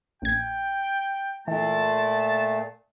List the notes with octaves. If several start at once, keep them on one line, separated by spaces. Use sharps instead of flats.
A#1 G5 G#6
A#2 E3 A3 A5